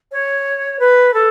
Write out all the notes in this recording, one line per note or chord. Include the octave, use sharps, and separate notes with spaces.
C#5
B4
A4